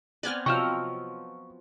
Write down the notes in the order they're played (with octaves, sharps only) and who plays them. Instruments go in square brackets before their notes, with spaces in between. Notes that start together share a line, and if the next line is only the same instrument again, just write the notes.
[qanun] B3 C4 B4 [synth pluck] D5 G#5 F6
[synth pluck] C3 [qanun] F3 F#3 D#5 [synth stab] G5 E6 F6 [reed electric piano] C#6